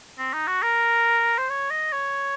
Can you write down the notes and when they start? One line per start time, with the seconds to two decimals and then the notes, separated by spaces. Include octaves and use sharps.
0.18 C4
0.33 D#4
0.47 F#4
0.62 A#4
1.38 C5
1.49 C#5
1.70 D#5
1.92 C#5